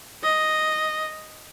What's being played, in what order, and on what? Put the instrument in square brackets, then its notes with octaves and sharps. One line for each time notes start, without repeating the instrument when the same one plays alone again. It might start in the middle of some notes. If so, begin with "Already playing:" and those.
[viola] D#5